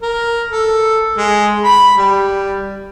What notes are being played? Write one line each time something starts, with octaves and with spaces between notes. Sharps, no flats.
A#4
A4
G#3
B5
G3